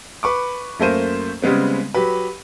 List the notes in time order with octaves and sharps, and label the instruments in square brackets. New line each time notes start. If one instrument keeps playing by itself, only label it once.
[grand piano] B4 C#6 D6
F#2 A3 A#3 C5 D#7
C#3 G3 G#3 B3 C4
F#3 G4 B4